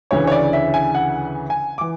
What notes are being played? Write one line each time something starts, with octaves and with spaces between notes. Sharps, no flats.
D2 C#3 E3 C#5
C#5
D5
E5
G#5
F#5
G#5
E3 D6